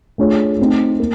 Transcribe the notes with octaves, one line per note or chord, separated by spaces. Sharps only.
A3 D4 F4 G#4 C#5
A3 C4 D#4
A#3